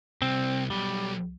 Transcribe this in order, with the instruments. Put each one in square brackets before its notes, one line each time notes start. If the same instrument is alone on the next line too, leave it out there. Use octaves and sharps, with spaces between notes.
[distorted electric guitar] C2 [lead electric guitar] C4
[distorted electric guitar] B1 [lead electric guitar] G3